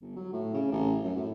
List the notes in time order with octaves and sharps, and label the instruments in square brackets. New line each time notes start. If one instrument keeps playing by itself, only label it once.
[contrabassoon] G1
F#3
A2
C#3
A1
F#2
A2